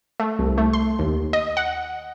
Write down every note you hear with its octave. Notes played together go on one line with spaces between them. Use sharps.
A3
C2
A3
C6
D#2
D#5
F#5